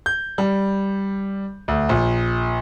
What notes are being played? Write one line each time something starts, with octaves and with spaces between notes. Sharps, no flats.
G6
G3
D2
A#1